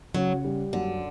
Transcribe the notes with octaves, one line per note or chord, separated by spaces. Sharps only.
C#3 F#3
G3
F#2 D3